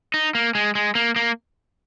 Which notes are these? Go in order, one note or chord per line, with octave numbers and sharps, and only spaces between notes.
D#4
A#3
G#3
G#3
A#3
A#3